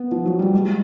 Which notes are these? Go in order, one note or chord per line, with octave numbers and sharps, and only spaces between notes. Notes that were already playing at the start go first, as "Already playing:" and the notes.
Already playing: B3
F3
F#3
G3
G#3